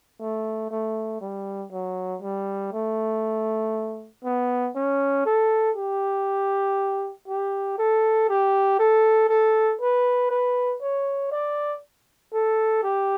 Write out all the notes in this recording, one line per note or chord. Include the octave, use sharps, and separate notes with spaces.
A3
A3
G3
F#3
G3
A3
B3
C#4
A4
G4
G4
A4
G4
A4
A4
B4
B4
C#5
D5
A4
G4